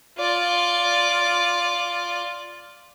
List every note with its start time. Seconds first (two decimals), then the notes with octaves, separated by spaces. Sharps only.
0.18 F4 D5